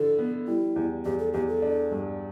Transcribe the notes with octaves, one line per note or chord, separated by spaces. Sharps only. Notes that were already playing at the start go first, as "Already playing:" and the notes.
Already playing: D3 E4 A4
B3
G3 E4
E2
E2 G4
A4
E2 G4
A4
D4
G2